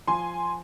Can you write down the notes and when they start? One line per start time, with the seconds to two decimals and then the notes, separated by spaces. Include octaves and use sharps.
0.07 F3 G#5 C6